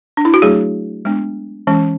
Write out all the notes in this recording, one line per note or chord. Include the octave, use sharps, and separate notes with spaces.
D4
E4
F#4
F#3 A3 D4 G#4
G#3 B3 D4
E3 G#3 C#4